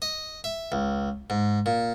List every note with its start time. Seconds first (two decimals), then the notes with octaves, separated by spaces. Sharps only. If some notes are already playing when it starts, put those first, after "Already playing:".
0.02 D#5
0.44 E5
0.72 C#2
1.30 G#2
1.66 A#2